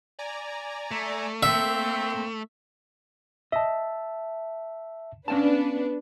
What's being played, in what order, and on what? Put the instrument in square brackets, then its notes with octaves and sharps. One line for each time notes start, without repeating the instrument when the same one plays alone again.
[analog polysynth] D5 G#5 A#5
[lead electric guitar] A3
[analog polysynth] A#3 [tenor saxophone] C4 [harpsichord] E5
[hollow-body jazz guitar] D#5 [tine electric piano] E5 A5
[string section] B3 D4 B4 [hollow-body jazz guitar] C#4 F5 A5